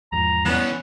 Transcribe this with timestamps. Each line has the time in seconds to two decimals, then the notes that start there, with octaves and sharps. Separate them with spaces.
0.12 E2 G#2 F3 A#5
0.45 E3 G3 B3 C#4